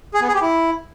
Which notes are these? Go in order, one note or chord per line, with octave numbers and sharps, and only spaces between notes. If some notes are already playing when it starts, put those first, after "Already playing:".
G#4
B3
G#4
G4
E4